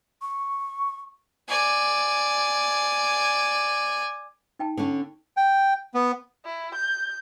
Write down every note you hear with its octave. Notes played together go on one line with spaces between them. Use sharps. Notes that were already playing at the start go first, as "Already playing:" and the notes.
C#6
D5 G#5
D#4 G5 A5
D3 C#4
G5
B3
E4
G6